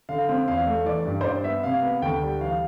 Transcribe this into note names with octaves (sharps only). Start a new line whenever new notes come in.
D3 F5
C4
E2 F5
A3
E3 D5
G2
C5
G2 D5
B3 E5
C3 F5
B3
D2 G5
G3
E3 F5